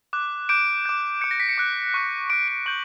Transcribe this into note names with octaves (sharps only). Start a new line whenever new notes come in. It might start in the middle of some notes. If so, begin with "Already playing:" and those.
D6 F#6
D6 G6 D7
D6 G6
D6 G6 C#7
A#6
B6
C#7
D6 F#6
C#6 F#6
C#6 F#6 D7
D7
C#6 G6 F#7